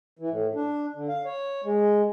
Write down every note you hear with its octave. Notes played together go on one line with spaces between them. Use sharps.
E3
A2
D4
D3
F5
C#5
G#3